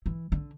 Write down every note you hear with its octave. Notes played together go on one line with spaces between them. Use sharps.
E3
D3